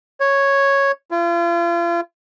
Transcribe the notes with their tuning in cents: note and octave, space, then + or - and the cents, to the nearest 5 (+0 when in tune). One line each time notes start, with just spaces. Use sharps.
C#5 -5
F4 -40